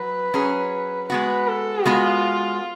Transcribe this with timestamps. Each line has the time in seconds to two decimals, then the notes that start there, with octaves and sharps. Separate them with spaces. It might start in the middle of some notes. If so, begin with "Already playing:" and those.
Already playing: F#3 B4
0.34 F#3 C#4 G#4
1.10 G#3 B3 F#4 B4
1.48 A4
1.85 G#3 B3 F4 F#4